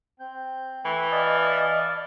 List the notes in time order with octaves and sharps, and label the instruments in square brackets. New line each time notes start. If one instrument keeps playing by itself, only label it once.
[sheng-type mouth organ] C4 G6
[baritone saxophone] E3 [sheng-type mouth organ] A3 G5 C#6
[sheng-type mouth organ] D5 F5 A5 [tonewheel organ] D#5